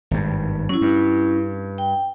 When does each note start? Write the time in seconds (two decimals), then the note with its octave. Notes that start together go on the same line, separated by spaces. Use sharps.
0.11 G#1 G2
0.69 F#3 C#4 E4
0.81 G2
1.78 G5